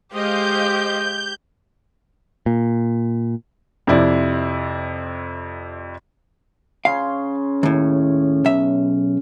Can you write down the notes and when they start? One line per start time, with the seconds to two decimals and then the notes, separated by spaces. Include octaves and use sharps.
0.13 G#3 G4 C5 D#5 F5 G6
2.46 A#2
3.87 F2 C3 E4 D5
6.85 C#3 C#4 F5 C6
7.63 D#2 A2
8.45 B1 E5